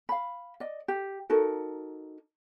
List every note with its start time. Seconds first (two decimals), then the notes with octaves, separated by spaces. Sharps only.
0.09 F5 B5
0.60 D5 D#5
0.88 G4
1.30 D#4 F#4 A4 A#4